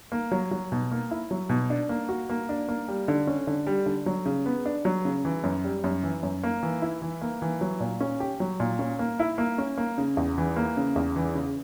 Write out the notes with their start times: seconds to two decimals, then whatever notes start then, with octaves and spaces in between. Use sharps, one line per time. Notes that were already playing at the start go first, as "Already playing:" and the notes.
0.12 A#3
0.32 F#3
0.51 F#3
0.72 B2
0.91 A#3
1.11 E4
1.31 F#3
1.49 B2
1.70 D4
1.89 A#3
2.09 F#4
2.29 A#3
2.49 D4
2.68 A#3
2.88 G3
3.08 D3
3.27 C#4
3.47 D3
3.67 G3
3.86 D3
4.06 F#3
4.26 C#3
4.46 B3
4.65 D4
4.85 F#3
5.05 C#3
5.25 E3
5.44 F#2
5.64 G3
5.84 F#2
6.03 E3
6.23 F#2
6.43 A#3
6.63 E3
6.82 E4
7.02 E3
7.22 A#3
7.42 E3
7.61 F#3
7.80 A#2
8.00 C#4
8.20 G4
8.40 F#3
8.60 A#2
8.79 C#4
8.99 A#3
9.19 E4
9.38 A#3
9.58 C#4
9.78 A#3
9.98 C#3
10.17 E2
10.38 E3
10.56 A#3
10.77 C#3
10.96 E2
11.16 E3
11.35 C#3